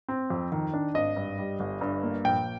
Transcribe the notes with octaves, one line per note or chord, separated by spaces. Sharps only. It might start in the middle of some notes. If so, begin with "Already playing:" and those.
C4
F2
D#3
D4
G#1 D#5
G2
G3
G1
G2
A#3
A#1 G5